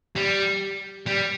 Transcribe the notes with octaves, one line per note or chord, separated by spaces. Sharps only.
G3
G3